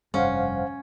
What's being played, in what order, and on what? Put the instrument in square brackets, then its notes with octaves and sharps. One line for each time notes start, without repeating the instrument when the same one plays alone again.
[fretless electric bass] F1 G2 [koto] C#4 [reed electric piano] C5 F5 F#5